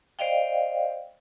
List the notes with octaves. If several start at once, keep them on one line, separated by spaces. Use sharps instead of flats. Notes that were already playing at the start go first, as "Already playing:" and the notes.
C5 D5 D#5 F5 G5